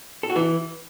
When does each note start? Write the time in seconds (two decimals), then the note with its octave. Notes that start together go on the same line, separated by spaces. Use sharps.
0.23 A4
0.30 F#4
0.36 E3